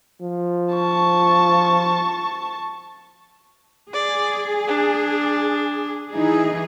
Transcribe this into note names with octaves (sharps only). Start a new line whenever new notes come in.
F3
A5 C#6
G#4 D5
D4
E3 D#4 G#4